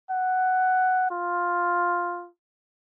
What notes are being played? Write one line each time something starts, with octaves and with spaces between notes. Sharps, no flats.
F#5
F4